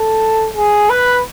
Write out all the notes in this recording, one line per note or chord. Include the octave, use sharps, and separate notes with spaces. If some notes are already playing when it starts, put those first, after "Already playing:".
Already playing: A4
G#4
B4